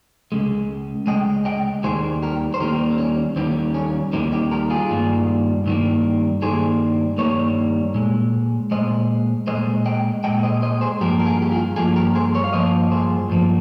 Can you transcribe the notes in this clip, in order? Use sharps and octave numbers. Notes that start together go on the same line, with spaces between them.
C#2 C#3 G#3
C#2 C#3 G#3 D#5 G5
D#5 G5
D#2 D#3 G3 A#3 G#4 C5
G4 A#4
C5
D#2 D#3 G3 A#3 G4 A#4
C4
C#4
D#2 D#3 G3 A#3 C4
C#4
D#2 D#3 G3 A#3 C4 D#4
D#4 G4
G4 A#4
F4 G#4
G2 D#3 G3 A#3
G2 D#3 G3 A#3
G2 D#3 G3 A#3 G#4 C5
G2 D#3 G3 A#3 A#4 C#5
A#2 G#3
A#2 G#3 C5 D#5
A#2 G#3 C5 D#5
D#5 G5
A#2 G#3 D#5 G5
C5 D#5
C5 D#5
G#4 C5
G2 F3 A#3 G4 A#4
A#4
F4 G#4
G4
F4 G#4
G2 F3 A#3 F4 G#4
G4 A#4
G#4 C5
A#4 C#5
F5
G2 F3 A#3 C5 D#5
G#4 C5
G2 F3 A#3